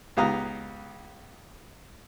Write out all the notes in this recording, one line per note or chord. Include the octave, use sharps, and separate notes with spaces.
C#2 B3 G4 F5 A#5 D#6